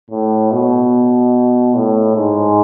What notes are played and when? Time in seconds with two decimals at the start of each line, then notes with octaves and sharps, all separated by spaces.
0.10 A2
0.51 B2
1.75 A2
2.16 G#2